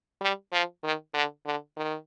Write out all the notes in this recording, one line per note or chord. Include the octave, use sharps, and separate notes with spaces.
G3
F3
D#3
D3
D3
D#3